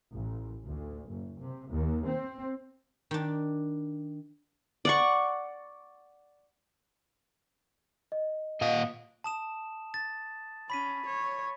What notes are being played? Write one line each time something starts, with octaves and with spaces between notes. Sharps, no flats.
A1
D2
F#1
C3
D#2
C4
D#3 D4
D5 F#5 C#6
D#5
A#2 D#5 F5
A5 D#6 E7
A6
C#4 B5 B6 D#7
C#5